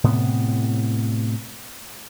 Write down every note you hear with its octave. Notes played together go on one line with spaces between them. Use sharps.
A2 C3 B3